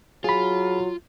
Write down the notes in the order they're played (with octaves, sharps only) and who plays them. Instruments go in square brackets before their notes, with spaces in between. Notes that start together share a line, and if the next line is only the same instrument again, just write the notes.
[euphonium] F#3 [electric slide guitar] F4 [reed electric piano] G#4 B5